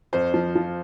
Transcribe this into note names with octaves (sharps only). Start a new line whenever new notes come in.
F2 C5
F3
F3